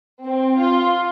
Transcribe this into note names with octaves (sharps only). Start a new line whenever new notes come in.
C4
F4